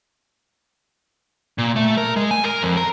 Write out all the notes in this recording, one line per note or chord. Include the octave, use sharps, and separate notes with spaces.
A#2
A3
A#4
G#3
G#5
A#4
F2
A#4